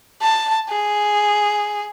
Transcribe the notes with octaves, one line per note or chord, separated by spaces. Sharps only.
A5
G#4